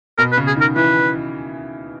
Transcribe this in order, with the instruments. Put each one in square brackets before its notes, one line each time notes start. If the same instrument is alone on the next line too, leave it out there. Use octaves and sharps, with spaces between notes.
[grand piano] B2 [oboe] A#4
[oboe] B4
[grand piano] C#3
[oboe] G#4
[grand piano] D#3 [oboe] A#4
[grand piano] E3 [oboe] B4